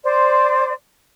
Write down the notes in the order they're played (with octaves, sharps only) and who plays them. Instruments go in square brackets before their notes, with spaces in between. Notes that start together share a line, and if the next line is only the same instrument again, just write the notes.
[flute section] C5 D5